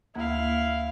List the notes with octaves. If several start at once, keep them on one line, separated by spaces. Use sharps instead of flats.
D2 A#3 E4 F5 G#6